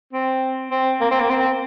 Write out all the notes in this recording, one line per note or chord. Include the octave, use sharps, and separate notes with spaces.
C4
C4
A#3
C4
A#3
C4